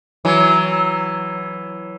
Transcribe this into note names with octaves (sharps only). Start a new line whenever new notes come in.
E3 F#3